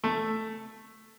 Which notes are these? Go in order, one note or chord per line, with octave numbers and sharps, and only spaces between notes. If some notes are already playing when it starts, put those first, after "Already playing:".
A3